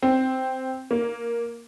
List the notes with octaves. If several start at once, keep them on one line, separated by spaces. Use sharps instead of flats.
C4
A#3